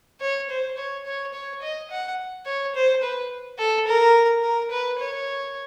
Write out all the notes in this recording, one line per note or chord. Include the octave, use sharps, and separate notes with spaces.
C#5
C5
C#5
C#5
C#5
D#5
F#5
C#5
C5
B4
A4
A#4
A#4
B4
C#5